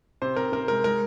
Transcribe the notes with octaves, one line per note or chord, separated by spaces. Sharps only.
C3 C5
C3 A#4
C3 A#4
G#3 A#4
G#3 A#4